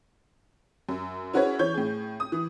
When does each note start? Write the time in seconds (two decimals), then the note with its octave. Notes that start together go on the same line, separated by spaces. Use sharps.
0.89 F#2
1.33 C#4 E4 F#4 G#4 B4 C#5
1.59 E3 C#5 G6
1.74 A2 G#4
2.20 D#6
2.32 E3